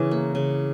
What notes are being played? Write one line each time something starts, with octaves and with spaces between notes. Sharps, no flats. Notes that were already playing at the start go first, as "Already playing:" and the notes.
Already playing: C#3 E3
A#3
C#3